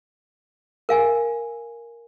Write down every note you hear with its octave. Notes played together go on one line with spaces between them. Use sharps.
A#4 F5 G#5